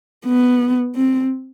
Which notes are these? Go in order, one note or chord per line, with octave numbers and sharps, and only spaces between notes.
B3
C4